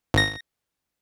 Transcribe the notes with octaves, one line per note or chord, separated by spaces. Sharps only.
G#1 A#6